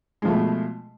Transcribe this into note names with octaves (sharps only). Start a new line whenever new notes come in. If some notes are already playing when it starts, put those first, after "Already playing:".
B2 F3 G#3 A3